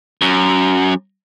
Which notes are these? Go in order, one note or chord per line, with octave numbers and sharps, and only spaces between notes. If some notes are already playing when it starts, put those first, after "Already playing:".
F#2